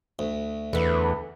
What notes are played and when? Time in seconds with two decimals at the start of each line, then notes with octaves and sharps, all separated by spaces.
0.19 D2
0.73 E2 D3 B3